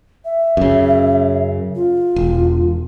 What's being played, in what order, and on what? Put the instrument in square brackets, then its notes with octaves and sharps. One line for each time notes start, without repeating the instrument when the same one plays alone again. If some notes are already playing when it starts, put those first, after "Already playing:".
[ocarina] E5
[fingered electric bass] F#2 C#3
[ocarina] F4
[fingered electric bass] E1